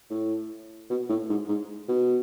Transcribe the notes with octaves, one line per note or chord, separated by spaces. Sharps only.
A2
B2
A2
G#2
G#2
B2